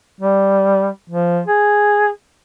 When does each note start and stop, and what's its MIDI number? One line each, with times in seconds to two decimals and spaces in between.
0.20 0.88 55
1.10 1.41 53
1.46 2.08 68